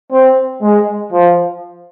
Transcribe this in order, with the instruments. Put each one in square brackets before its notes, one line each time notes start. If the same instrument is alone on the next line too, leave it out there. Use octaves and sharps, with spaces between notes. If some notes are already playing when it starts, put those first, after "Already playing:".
[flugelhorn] C4
G#3
F3